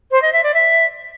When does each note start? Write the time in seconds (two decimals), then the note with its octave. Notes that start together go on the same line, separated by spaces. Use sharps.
0.11 C5
0.22 D#5
0.32 E5
0.43 D5
0.54 E5